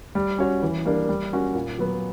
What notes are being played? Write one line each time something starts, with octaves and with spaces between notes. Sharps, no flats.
G3
C#4 F#4 C#5
E3
G3 A#3 D4
G3
A#3 C#4 F#4
A#2
F#3 B3